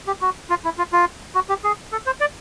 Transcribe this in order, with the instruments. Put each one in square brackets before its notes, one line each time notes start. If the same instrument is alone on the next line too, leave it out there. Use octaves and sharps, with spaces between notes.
[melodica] G4
F#4
F4
E4
F4
F4
F#4
G4
G#4
A4
C5
D5